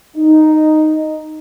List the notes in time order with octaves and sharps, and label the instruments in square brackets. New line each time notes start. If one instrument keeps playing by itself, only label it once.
[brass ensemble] D#4